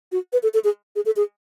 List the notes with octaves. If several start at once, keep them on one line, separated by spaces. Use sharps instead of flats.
F#4
B4
A4
A4
G#4
G#4
A4
G#4